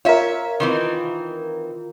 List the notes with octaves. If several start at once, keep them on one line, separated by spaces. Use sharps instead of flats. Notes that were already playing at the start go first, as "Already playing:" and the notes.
F4 A#4 C#5 E5
D#3 E3 C4